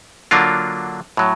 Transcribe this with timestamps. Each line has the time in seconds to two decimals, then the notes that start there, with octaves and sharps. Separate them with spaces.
0.31 D3 F#3 A#3 D4 F4
1.17 A2 F#3